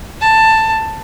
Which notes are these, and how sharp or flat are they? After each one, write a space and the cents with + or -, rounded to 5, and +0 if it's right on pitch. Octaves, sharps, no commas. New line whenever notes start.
A5 +10